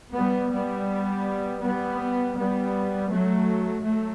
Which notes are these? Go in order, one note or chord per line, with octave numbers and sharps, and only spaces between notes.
G3 B3
G3 B3
G3 B3
G3 B3
F#3 A3
F#3 A3